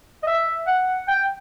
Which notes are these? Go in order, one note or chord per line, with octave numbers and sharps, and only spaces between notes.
D#5
E5
F#5
G5